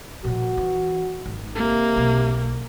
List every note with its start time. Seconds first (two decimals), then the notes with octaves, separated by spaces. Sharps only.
0.24 A#2 F3 F#4
0.58 E3
1.26 G#1
1.56 C3 A#3
1.96 B1